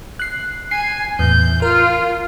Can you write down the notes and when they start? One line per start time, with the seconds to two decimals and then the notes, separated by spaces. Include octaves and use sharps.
0.19 F#6 C7
0.71 G#5 C7
1.19 E2 A2 G6
1.62 F4 A#4